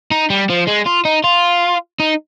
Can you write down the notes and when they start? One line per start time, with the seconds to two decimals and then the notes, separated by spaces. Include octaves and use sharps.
0.11 D#4
0.30 G3
0.49 F3
0.67 G#3
0.86 F4
1.05 D#4
1.24 F4
2.00 D#4